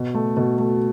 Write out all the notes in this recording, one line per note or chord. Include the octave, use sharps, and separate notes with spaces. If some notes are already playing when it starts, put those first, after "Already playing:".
Already playing: B2
A3
B2
A3